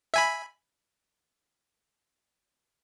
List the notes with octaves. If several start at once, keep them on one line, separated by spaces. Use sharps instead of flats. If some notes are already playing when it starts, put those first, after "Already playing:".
E5 G#5 B5